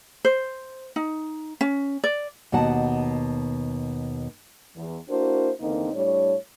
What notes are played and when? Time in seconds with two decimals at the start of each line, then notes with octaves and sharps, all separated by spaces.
0.25 C5
0.96 D#4
1.61 C#4
2.04 D5
2.52 D#2 B2 F#4 F#5 A5
4.75 E2
5.10 A#3 D4 E4 F#4 A#4 C5
5.60 E2 D3 D#3 A#3 C4 D#4
5.93 A2 G3 D4 C#5